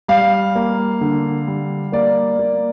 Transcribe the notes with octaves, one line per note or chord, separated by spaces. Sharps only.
G3 F5
A#3
D3
G3
A#3 D5
A#3